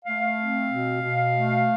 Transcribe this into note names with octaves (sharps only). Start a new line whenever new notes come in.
A3 F5
C4
B2
B2
A3